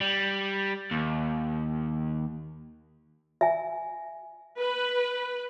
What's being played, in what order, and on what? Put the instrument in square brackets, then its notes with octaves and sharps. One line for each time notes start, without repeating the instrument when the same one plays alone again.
[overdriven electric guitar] G3
D#2
[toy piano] E5 G#5
[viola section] B4